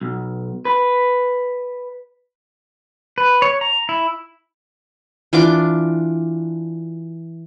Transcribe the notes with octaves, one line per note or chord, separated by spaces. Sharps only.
B1
B4
B4
C#5
A#5
E4
E3 D4 F4 D6